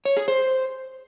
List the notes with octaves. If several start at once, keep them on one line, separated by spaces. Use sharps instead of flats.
C#5
G#4
C5